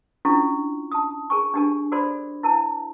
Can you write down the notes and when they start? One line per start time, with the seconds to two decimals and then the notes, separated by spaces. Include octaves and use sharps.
0.25 C#4 D4 E4 F4 A4 C#6
0.92 A5 D#6
1.30 G#4 A#4 G#5 C#6
1.54 D4 D#4 G4 A#4 G#5
1.92 F#4 A4 A#4 C5 D5 B5
2.43 E4 A#4 A5